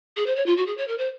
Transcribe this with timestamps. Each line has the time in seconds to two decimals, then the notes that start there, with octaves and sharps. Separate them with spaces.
0.16 G#4
0.26 C5
0.36 C#5
0.46 F4
0.57 F#4
0.67 G#4
0.78 C#5
0.88 A#4
0.98 C5